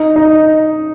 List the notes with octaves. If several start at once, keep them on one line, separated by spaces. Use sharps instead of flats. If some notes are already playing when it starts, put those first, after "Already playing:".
Already playing: D#4
D#4